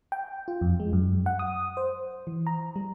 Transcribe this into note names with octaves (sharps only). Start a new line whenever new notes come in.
G5
F4
F2
G#3
F#2
F#5
D#6
C5
E3
A#5
G3